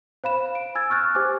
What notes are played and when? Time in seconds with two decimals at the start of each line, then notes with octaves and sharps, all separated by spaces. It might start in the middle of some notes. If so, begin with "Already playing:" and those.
0.24 C5 F5 B5 E7
0.55 D7
0.75 G#5 E6 G#6 A6
0.90 C#6 F6 F#6 A6
1.15 G4 C5 G#5 D6